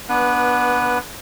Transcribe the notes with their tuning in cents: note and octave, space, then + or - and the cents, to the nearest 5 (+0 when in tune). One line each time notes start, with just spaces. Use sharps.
B3 -15 D4 +0 B4 +0